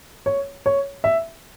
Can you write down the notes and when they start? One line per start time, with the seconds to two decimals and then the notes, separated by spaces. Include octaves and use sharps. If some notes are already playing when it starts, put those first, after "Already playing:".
0.26 C#5
0.66 C#5
1.04 E5